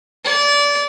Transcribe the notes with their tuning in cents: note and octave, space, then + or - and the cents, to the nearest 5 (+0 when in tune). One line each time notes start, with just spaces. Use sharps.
D5 -25